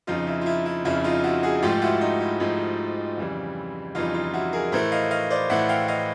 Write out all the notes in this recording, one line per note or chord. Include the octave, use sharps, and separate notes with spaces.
F2 C#3 F3 D#4 F4
E4
F4
E4
E4
F2 C#3 F3 E4
D#4 F4
E4 F#4
F#4 G#4
G#2 F3 A3 F4 G4
E4 F#4
D#4
E4
G#2 F3 A3 E4
F2 C#3 E3 G3
F2 C#3 E3 G3 D#4 F4
D#4 F4
E4 F#4
G#4 A#4
A2 E3 A3 A#4 C5
D#5 F5
D#5 F5
C5 D5
A2 E3 A3 E5 F#5
F5 G5
D#5 F5